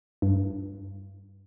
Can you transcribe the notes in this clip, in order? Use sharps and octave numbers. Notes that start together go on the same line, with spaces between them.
G2